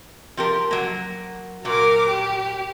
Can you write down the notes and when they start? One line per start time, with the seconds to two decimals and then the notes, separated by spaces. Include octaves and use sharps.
0.37 F3 G4 A#4
0.71 F#3 A#3
1.65 A#2 F#3 A#4 D6
2.09 G4